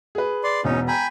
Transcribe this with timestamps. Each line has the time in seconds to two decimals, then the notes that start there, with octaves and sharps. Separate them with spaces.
0.15 G#4 B4
0.44 D5 C6
0.64 E1 E2 C#4 D#4
0.88 G5 G#5 A#5 B5